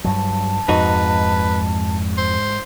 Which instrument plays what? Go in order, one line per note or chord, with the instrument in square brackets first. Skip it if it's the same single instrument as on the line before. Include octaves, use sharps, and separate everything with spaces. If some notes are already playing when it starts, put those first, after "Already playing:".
[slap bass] G2 F#3 [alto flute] A5
[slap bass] F2 [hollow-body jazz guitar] G#2 D#4 F#4 [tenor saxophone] B4
[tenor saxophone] C5